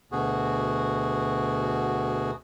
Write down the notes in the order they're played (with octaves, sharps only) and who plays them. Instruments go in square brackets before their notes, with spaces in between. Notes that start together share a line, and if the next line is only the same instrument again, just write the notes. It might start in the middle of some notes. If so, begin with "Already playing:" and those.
[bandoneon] D2 B2 F#4 G#4